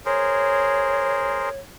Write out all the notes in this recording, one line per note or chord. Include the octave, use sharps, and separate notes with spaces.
G#4 A#4 C5 C#5